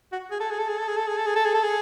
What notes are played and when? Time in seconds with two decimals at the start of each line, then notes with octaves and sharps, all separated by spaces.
0.12 F#4
0.31 G#4
0.40 A4
0.50 G#4
0.59 A4
0.68 G#4
0.78 A4
0.88 G#4
0.97 A4
1.07 G#4
1.17 A4
1.26 G#4
1.36 A4
1.45 G#4
1.54 A4
1.63 G#4